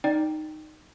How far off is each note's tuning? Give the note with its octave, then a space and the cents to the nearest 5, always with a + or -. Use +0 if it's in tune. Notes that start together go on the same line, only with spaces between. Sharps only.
D#4 -5 D5 +0 G5 +0